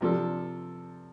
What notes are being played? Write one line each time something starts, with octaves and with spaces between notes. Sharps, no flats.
C3 F3 D4 A4